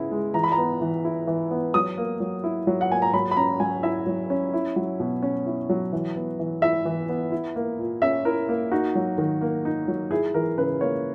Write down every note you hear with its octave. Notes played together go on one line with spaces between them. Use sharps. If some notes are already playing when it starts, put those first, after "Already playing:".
Already playing: C#3 G#3 B3 E4
G#3
E3 A#5
B5
A#5
B3
E3
E4
E3
B3
F#3 D#6
A#3
F#3
E4
F#3
F#5
A#3 G#5
A#5
F#3 B5
B5
C#4 A#5
F#3 G#5
E4 E5
F#3
C#4
E4
F#3
B2
C#4
E4
F#3
E3
B3
E3
E4 E5
E3
B3
E4
A#3
A#2
C#4 E5
E4 A#4
A#3
D#4 F#4
F#3
D#3
A#3
D#4
F#3
E4 G#4
E3 A#4
C#3 B4
A#3 C#5